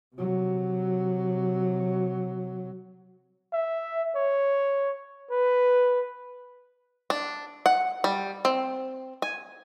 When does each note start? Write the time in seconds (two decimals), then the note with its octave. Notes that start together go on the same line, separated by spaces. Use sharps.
0.16 C3 F#3
3.53 E5
4.15 C#5
5.31 B4
7.10 D4
7.66 F#5
8.04 G3
8.45 C4
9.22 G#5